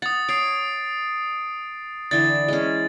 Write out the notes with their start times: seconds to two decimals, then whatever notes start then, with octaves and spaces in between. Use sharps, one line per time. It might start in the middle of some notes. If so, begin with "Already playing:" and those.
0.02 F#5 D#6 A6
0.29 C#5 D#6 C7 D7
2.11 D3 E3 D5 A6
2.48 G#3 C#4